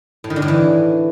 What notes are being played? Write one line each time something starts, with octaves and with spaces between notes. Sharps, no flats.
A2
D#3
D3
A2
E3